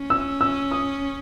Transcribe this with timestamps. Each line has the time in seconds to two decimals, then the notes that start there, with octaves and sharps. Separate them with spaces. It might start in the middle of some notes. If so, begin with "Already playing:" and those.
Already playing: C#4
0.10 E6
0.41 E6
0.71 D#6